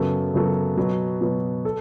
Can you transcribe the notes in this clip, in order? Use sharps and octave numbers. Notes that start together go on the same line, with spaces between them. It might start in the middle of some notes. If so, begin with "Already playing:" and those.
Already playing: F#2 C#3 F#3 B3 A4
F#2 C#3 F#3 B3 A4
B2 F#3 B3
B2 F#3 B3
A4